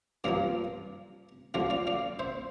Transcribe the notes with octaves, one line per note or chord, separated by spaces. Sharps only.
G2 F3 A#3 D5 F5
D2 D3 F3 D5 F5
D5 F5
D5 F5
C5 E5